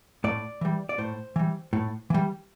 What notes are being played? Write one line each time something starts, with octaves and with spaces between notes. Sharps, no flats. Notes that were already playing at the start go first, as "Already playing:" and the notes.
A2 D5
E3 G3
D5
A2 C5
E3 G3
A2
E3 G3